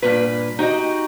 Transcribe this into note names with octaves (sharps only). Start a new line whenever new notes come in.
G2 A#2 B4
D#4 F#4 G4 D#5